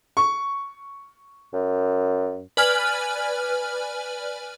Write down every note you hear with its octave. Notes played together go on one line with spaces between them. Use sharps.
C#6
F#2
B4 D5 G#5 F6